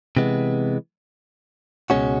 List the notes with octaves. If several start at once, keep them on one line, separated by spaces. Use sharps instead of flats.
C3 E3 G#3 B3
C#2 B2 G#3 C#4 F#4